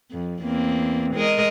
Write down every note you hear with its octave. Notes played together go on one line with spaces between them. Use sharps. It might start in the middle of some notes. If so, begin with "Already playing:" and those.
F2
E2 A#3 C4
G#3 A#4 D#5